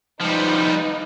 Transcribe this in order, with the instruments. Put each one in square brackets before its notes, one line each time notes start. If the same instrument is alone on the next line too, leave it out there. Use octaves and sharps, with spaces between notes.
[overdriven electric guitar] F3 G3 [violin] D#4 B4